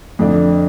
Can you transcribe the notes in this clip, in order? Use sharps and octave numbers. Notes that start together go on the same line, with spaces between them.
F2 D3 A3 D4